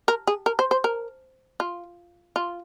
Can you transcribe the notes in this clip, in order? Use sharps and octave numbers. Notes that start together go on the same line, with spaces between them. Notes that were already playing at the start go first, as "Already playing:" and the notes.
A#4
G#4
A#4
C5
C5
A#4
F4
F4